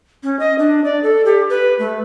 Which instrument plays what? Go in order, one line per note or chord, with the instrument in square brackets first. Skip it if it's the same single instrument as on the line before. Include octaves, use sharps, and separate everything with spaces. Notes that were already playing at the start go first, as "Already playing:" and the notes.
[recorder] C#4
D#5
D4
D5
A4
G4
B4
A3